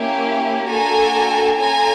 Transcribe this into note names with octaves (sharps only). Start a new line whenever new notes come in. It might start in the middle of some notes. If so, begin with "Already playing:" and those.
Already playing: A#3 C#4 E4 G4
A#3 D4 F#4 A4 G#5 A#5
C#4 F4 A4 G#5 A#5